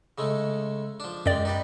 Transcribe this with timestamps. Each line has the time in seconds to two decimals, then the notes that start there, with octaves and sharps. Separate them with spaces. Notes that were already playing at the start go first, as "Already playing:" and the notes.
0.18 C#3 G#3 A3
1.00 F3 D4
1.26 F#2 G#3 D5 G5
1.45 D#4 G4 B4